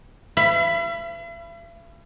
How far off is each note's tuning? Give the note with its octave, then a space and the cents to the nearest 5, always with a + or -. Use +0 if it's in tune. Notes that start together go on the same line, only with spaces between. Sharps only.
E5 +45 B5 +10